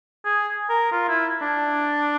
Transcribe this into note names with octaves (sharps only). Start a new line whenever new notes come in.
G#4
A#4
F4
E4
D4